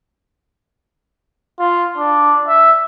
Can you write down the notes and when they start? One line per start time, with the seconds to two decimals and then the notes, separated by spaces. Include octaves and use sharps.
1.60 F4
1.98 D4
2.48 E5